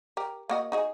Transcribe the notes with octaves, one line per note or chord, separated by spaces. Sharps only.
G4 A#4
A#3 F#4 D#5
D#4 F#4 G#4